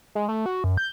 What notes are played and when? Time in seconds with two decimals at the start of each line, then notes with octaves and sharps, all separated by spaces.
0.15 G#3
0.28 A3
0.46 F#4
0.64 F#2
0.77 G6